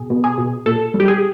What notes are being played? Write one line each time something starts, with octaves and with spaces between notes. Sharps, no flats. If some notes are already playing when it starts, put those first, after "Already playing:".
Already playing: B2 G#4
B2
G#4
B2
A#2 A4
G3
G4
G#4